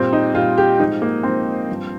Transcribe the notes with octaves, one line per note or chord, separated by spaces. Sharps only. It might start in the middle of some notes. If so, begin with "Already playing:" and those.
Already playing: A#2 G3 C4
D#4
A#2 G3 F4
G4
G#2 F3 D#4
A#3
G#2 F3 C4
G2 F3